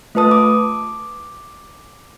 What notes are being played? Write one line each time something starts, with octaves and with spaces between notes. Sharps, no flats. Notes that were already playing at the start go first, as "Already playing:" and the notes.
A3 F4 B4 A5 D#6
D6